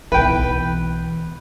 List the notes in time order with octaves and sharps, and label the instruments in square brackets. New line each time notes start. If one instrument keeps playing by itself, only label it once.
[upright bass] B1 E3 [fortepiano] B4 G5